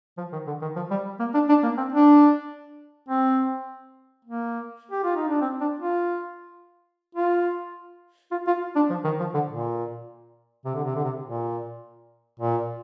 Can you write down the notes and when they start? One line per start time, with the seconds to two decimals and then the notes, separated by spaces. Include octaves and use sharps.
0.17 F3
0.32 D#3
0.47 D3
0.62 D#3
0.76 F3
0.91 G3
1.19 A#3
1.34 D4
1.49 D4
1.63 A#3
1.77 C4
1.92 D4
3.08 C4
4.25 A#3
4.91 G4
5.04 F4
5.16 D#4
5.28 D4
5.41 C4
5.60 D4
5.79 F4
7.15 F4
8.31 F4
8.47 F4
8.76 D4
8.90 F3
9.04 D#3
9.19 F3
9.34 D3
9.49 A#2
10.65 C3
10.74 D3
10.85 C3
10.95 D3
11.04 C3
11.23 A#2
12.39 A#2